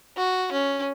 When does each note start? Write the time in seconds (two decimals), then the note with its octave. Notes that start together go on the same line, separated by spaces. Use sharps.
0.17 F#4
0.52 C#4